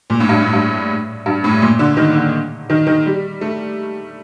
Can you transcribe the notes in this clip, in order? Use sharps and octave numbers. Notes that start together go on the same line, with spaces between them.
A#2
A2
G2
A2
G2
G2
A2
A#2
D3
D#3
D3
D#3
D#3
G3
A3